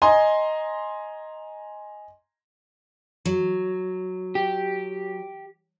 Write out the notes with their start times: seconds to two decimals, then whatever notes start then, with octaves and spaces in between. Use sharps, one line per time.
0.02 D#5 G#5 A#5 C6
3.25 F#3
4.35 G4